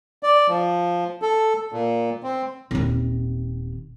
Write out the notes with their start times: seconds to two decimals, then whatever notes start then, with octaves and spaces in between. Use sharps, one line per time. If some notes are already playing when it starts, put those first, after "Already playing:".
0.23 D5
0.48 F3
1.22 A4
1.72 A#2
2.23 C4
2.71 D#1 C3